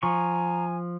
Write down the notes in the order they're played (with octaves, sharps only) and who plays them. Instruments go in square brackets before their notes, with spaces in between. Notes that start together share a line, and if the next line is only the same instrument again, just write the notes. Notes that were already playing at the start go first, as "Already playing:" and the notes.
[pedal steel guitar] F3 C#6 [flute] G#5 [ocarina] A#5